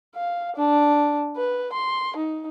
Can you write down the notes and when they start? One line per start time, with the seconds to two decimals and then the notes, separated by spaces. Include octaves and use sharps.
0.16 F5
0.56 D4
1.36 B4
1.73 C6
2.17 D#4